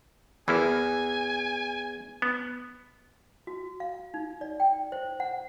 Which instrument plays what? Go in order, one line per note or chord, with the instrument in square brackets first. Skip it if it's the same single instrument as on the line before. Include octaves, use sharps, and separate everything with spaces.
[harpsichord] E2 [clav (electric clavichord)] E3 A#3 E4 [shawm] G#5
[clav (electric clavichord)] B3
[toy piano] F#4
F5
D#4
D5
G5
C5
F#5